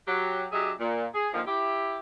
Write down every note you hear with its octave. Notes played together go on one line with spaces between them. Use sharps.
F#3 G4
F#3 D4 G4 G#4 D#5 E5
A#2
G#4
A#2 D3 D#3 F3
E4 G4